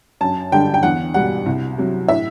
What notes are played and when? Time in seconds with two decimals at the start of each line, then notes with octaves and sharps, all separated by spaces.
0.21 F#2 A5
0.52 D3 G3 G5
0.74 G5
0.83 E2 F#5
1.14 B2 G3 F#5
1.46 C2
1.78 C3 F#3
2.08 A2 E5